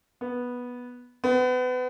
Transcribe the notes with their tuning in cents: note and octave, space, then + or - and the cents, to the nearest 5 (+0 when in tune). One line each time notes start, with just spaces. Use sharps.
B3 -10
B3 +30